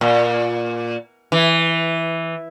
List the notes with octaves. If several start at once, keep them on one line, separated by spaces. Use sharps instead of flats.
A#2
E3